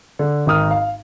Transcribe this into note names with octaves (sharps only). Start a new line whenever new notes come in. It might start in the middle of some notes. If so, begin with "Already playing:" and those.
D3
G#1 D#3 D#4 D#6 F6
F5